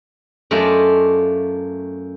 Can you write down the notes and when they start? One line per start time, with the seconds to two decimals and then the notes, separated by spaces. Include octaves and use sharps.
0.51 F#2 A3 F4 A4 D5 D#5